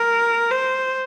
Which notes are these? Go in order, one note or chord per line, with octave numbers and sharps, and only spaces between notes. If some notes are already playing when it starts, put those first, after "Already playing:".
Already playing: A#4
C5